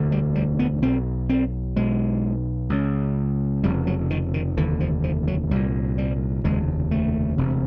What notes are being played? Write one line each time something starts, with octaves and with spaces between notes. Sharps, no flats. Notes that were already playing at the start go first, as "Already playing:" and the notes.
Already playing: E1 D2 D3
G3
G3
B3
B1 B2 C4
C4
B1 B2 G#3
C#2 C#3
F1 F2 C#3 G3
F#3
D#3
D#3
F1 D#2 D3 E3
F3
F3
F#3
C2 A#2 G3
G3
F1 D#2 C#3 G#3
A3
E1 D2 C3